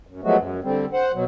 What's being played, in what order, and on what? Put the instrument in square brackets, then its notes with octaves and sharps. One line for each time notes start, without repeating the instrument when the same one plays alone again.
[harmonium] F#2
F3 F#3 G#3 A3 B3 F#4
F#2
D3 G3 C4
C5 F#5
B2 F#3